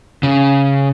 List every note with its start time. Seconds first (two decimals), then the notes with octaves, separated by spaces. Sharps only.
0.23 C#3